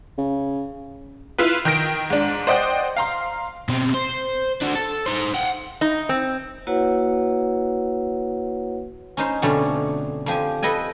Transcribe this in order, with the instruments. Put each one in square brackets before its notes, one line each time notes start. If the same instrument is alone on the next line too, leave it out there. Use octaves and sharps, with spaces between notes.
[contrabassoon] C#3
[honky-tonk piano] E4 F4 B4
D#3 G5 A#6 D7
G#2 D4
C5 D5 D#5 F#5 G5
F5 A#5 C6
[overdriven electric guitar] B2 C4
C5
D4 F#4
A4
D#4 C5
F#5 G5
[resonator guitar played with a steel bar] D#4
C4
[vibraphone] A#3 E4 F#4 B4 C#5 F#5
[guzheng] C#4 D#4 C5
F2 B2 D3 A3 C#4 D4
F2 F3 G4 G#5
A4 B4 D#5 G5 G#5